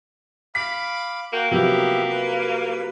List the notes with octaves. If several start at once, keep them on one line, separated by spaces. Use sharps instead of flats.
F5 B5 D6 B6
A#3 F#4 G5
C3 F3 F#3 A#3 B3 G4 E5
B4